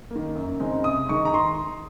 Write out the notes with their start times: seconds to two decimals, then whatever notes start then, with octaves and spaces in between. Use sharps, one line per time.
0.11 D#3 A#3
0.35 F#2
0.59 C#3 G#3 C4 D#4
0.84 C3 D#6
1.09 D#3 G#3 D#4 C#6
1.25 A#5
1.33 D#3 C6